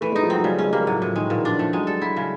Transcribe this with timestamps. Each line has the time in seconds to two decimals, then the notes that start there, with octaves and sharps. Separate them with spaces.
0.01 E3 A3
0.12 G#3 D#4
0.23 F3
0.30 F#3 C4
0.44 C#3 G3
0.58 G#3 C#4
0.73 G3 A#3
0.87 A2 F#3
1.02 A2 F3
1.16 D#3 G#3
1.30 A#2 E3
1.44 F3 D4
1.59 F3 A3
1.73 F#3 G#3
1.87 G3 A4
2.02 F#3 E4
2.17 C#3